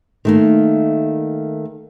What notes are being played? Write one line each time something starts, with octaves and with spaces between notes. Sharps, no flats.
D#3 A3 A#3